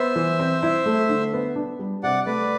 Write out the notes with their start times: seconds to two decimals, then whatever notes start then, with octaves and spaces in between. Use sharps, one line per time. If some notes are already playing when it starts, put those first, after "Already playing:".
Already playing: B3 C5 E5
0.16 E3
0.39 C4
0.63 E4
0.86 A3
1.09 D3
1.33 B3
1.56 D4
1.79 G3
2.03 C3 D5 F#5
2.26 A3 B4 D5